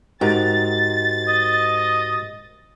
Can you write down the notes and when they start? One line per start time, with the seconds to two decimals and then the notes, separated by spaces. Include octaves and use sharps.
0.21 G#2 F#4 G4 A#4 A6
1.28 D#5